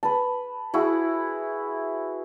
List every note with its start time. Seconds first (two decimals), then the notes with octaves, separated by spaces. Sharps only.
0.03 B4 A5
0.74 E4 F#4 G#4 F#5